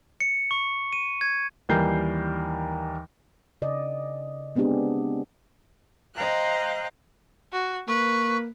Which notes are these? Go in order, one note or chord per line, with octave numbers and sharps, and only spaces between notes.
C#7
C#6
D#7
G#6
D#2 E3 G3 A#4 G6 C7
C#3 D5 D#5
G#3 B3 C4 D4 G4 G#4
C5 D#5 F5 G5 A#5 F#6
F#4
A#3 B4 C#6